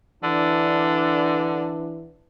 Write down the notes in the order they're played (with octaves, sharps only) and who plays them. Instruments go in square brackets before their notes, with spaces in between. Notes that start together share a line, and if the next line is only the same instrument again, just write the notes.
[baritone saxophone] D3 [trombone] E3 [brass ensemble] D4